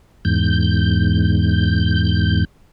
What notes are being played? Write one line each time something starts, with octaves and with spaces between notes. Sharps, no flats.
E2 G#2 G6